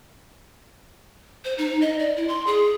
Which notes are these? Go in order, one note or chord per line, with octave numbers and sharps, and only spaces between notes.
C5
D#4
D#5
D5
E4
C6
G#4